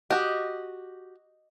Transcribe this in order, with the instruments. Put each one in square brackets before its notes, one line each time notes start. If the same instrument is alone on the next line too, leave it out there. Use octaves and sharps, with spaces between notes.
[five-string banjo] F#4 G4 [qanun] D#5